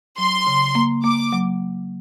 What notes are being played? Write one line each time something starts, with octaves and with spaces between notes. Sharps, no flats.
F#3 C6
C#3
A#3
A#3 D6
F#3